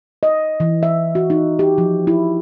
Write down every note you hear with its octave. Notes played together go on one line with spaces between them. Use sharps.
D#5
E3
E5
F#4
D#4
G4
F3
E4